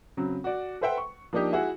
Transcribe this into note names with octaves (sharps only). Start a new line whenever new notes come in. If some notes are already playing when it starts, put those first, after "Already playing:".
C#3 F#3 C4
F#4 D5
A4 B4 C5 E5 F#5 G5
C#6
F3 A#3 D4 D#4 G4
E4 F#4 G#4 E5